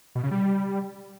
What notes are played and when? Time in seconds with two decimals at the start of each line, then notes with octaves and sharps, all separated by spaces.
0.15 B2
0.23 C#3
0.31 G3